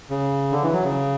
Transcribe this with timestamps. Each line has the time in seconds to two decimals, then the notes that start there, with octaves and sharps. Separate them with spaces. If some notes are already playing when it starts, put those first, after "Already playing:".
0.10 C#3
0.52 D3
0.63 E3
0.73 F#3
0.83 C#3